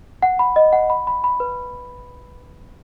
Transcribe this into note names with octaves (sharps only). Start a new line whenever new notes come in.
F#5
B5
D#5
F#5
B5
B5
B5
B4